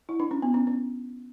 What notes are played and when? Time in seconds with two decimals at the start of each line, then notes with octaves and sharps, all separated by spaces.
0.09 E4
0.20 D4
0.31 C#4
0.42 B3
0.54 C#4
0.67 C#4